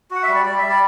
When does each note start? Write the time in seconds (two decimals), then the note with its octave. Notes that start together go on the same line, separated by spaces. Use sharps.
0.11 F#4 F#5
0.23 E5
0.28 G3
0.35 D5
0.46 G3 D5
0.58 E5
0.64 G3
0.69 D5